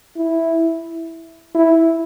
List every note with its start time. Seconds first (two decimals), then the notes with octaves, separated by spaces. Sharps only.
0.16 E4
1.55 E4